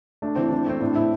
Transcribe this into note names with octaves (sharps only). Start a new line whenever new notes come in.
A3 D4
E3 C4
E3 D4
A3 C4
A2 D4
A2 E4